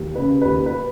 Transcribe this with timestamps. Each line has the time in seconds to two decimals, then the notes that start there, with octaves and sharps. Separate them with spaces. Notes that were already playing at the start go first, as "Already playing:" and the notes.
Already playing: D#2
0.15 C#3 B4
0.42 D#2 B4
0.66 B4